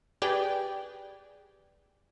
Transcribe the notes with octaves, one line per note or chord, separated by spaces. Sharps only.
G4 G#4 B4 D5 G5